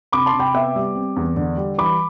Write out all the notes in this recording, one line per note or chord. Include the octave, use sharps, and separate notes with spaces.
C3 B5 D6
A5 C6
C3
G5 B5
B3 E5 G5
G3
C4
E2
D3
G3
E3 B5 D6